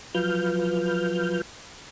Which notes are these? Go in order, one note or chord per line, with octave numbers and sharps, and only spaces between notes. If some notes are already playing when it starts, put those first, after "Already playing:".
F3 F#3 F4 B4 F6 G6